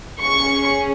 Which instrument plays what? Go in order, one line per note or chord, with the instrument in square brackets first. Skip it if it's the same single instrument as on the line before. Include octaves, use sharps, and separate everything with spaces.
[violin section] C#4 G#4 C#6